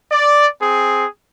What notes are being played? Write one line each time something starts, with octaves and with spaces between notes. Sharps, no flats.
D5
C4 G#4